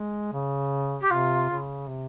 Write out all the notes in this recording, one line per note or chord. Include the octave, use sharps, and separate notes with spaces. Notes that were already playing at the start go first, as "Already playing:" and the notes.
Already playing: G#3
C#3
G4
C3 F4
C#3
C3